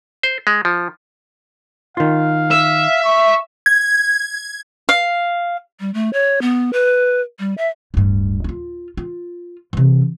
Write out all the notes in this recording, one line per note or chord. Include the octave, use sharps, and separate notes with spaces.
C5
G#3
F3
D#3 F4 F5
E5
C#6
G#6
F5
G3
A3
C#5
B3
B4
G3
E5
D1 G2
D#4 F4
F4
C3 E3